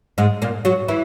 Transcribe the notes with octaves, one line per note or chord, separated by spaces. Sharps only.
G#2 G#3
A#2 A#3
F#3 F#4
E3 E4